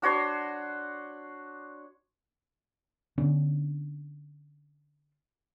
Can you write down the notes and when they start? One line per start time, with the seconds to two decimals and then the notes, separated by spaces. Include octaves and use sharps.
0.02 D4 F#4 C#5 C6
3.18 D3 B3 C#4 D4